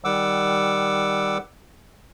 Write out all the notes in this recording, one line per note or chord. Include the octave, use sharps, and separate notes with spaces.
D#3 G3 F#5 D6 E6